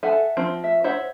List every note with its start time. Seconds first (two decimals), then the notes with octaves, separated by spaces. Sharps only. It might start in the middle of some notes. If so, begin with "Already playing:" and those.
0.03 A4 E5 F#5 G#5 A5
0.37 F3 C4
0.64 E5
0.84 C5 C#5 E5 F#5